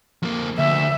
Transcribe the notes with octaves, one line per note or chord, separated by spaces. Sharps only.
F2 A#3
D2 E5